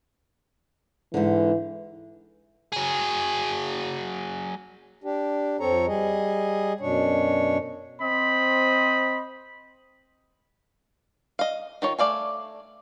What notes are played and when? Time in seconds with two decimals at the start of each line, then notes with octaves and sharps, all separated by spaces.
1.14 G#2 D3 E3
2.72 F#3 G#4
5.04 D4 G4
5.60 F2 F3 C4 A4 C#5 A#5
5.87 G3 G#4 D#5
6.80 F#2 B2 D4 C#5
8.01 C4 C5 D#5 B5
11.39 D#5 F5
11.82 D#3 F4 C#5
11.99 A3 D5 F5 G#5